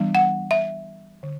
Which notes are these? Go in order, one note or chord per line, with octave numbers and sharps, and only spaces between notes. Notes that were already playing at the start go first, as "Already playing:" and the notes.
Already playing: E3 G3 B3 D4
F#5
E5
D3